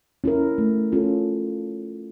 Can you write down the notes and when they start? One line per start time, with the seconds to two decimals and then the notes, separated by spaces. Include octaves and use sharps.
0.24 C#4 E4 A#4
0.58 A3
0.92 C#4 F4 A4